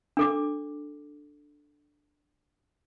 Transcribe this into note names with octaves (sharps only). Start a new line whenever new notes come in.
D4 A4 D6